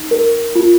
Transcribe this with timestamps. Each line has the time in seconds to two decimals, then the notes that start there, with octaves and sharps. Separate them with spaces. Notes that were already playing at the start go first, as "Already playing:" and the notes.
Already playing: D#4
0.11 A#4
0.55 F4